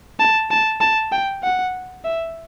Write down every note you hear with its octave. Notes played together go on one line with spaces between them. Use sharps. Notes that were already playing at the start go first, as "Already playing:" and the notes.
A5
A5
A5
G5
F#5
E5